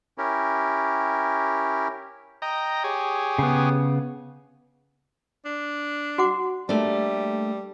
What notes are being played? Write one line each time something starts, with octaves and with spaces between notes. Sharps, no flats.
C#4 E4 G4 A#4
D#5 G5 A#5
G4 G#4 C#5
C#3 B3
D4
F#4 F#5 D6
G3 A3 A#3 D4